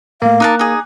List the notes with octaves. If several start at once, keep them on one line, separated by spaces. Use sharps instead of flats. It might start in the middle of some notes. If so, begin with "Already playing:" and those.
A2 A3 A#3 F5
D#4 A#4 A5 D6 F#6
D#4 G#4 G#5